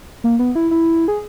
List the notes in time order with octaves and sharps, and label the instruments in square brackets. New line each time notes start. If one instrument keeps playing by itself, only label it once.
[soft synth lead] A#3
B3
E4
E4
G#4